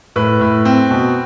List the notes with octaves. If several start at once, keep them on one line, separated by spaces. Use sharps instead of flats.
A2 B4
A2
C4
B2